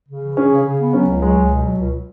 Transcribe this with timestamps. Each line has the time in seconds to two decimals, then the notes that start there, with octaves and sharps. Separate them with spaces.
0.09 C#3
0.23 E3
0.37 C#4 G#4
0.51 C#3
0.65 C#3
0.79 B3
0.93 F#3 C#4
1.07 C#2
1.21 F#3 G#3
1.36 C#2
1.51 B2
1.64 F#3
1.78 C#2